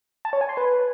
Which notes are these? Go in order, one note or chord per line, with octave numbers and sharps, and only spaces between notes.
A5
C#5
G#5
C6
B4